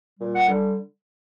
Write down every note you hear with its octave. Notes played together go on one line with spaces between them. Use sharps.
A#2 G3
F#5
D3 G3